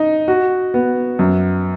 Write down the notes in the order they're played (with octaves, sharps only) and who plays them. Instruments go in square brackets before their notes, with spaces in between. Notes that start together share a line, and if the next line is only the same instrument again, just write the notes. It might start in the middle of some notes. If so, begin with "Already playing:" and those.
Already playing: [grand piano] D#4
F#4
B3
F#2